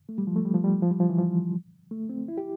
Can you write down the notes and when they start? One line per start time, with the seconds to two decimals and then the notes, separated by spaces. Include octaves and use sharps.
0.09 A3
0.18 G3
0.27 F3
0.36 A3
0.45 G3
0.54 F3
0.64 G3
0.82 F3
0.91 G3
1.00 F3
1.09 E3
1.19 F3
1.91 A3
2.09 C4
2.28 E4
2.38 G4